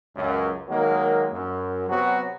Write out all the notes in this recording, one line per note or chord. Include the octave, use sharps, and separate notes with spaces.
C#2 F#2
D#3 F#3 G#3 A#3
F#2
C3 F#3 B3 F#4